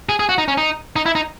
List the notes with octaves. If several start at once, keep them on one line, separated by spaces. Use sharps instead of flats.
G#4
G#4
F#4
D#4
C#4
D#4
D#4
E4
D#4